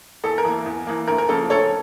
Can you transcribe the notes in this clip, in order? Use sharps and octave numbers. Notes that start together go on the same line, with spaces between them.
E2 A4
A#4
E3 A#3
E2
E3 A#3
D2 A#4
A#4
C#3 F3 A#3 A4
D2 A4 C#5